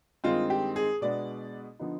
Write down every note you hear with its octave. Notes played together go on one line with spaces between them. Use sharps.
G2 D#3 G#3 C4 D#4 F4
G4
G#4
B2 G#3 B3 D4 D5
D3 F3 B3 D#4